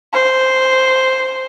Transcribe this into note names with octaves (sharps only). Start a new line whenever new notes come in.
C5